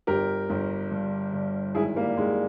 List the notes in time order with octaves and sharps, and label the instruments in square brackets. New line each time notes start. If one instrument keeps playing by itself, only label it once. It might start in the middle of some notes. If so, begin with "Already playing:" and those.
[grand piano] G1 G4 A#4
G1
G2
G2
G#1 E4 G#4
G3 A#3
G#1 G#3